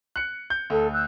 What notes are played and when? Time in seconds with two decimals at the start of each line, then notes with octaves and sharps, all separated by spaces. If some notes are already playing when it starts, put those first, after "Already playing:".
0.16 F#6 C#7
0.50 G6
0.70 D2 A4
0.93 E6 F#6 G6